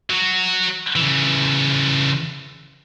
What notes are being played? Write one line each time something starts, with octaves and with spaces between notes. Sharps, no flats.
F#3 F#4
C#3 E3